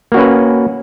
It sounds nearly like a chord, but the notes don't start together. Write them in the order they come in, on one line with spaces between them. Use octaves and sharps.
A#3 F#4 C#4 B4